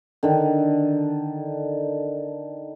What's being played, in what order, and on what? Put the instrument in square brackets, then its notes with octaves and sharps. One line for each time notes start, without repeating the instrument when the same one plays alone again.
[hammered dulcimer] D3 D#3